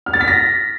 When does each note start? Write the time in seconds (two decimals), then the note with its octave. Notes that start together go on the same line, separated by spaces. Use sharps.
0.06 F6
0.13 A6
0.21 B6
0.28 A#6